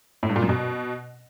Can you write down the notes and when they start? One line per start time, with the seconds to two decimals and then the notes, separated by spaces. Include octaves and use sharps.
0.23 A2
0.29 G2
0.36 A#2
0.42 F#2
0.49 B2